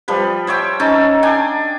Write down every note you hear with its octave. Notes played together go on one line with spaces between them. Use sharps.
F3 G3 B4
C5 C#5 E5 G5
C#4 D#4 A4
D4 G5 G#5